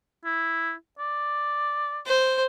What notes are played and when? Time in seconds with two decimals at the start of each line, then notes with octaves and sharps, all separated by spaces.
0.25 E4
0.99 D5
2.06 C5